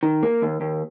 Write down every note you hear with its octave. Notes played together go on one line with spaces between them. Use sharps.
D#3
A#3
D#2
D#2